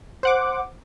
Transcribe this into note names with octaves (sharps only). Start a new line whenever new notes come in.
C5 F#5 D6